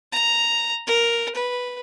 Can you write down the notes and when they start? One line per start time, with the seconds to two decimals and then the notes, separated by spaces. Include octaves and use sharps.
0.12 A#5
0.87 A#4
1.35 B4